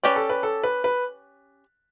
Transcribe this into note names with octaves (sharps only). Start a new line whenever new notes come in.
C#4 G4 B4 D5
A4
B4
A4
B4
B4